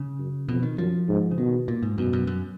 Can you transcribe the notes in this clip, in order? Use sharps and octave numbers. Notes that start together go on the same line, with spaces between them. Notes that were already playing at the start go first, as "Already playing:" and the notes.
Already playing: C#3
F#2
F2 B2
D#3
F#2 F3
G#2
C#3
B2 D#3
A#2
G#2
F#2 B2
F#2
F#2